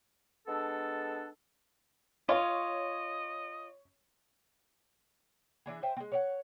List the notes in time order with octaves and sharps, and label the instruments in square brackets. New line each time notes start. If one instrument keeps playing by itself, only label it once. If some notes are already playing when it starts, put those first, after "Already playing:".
[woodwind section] G#3 B3 D4 A4
[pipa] F4 [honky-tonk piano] C#5 [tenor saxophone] D#5
[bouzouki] E3 D4 G#4
C5 E5 G5 G#5
G#3 C4
C#5 D5 F#5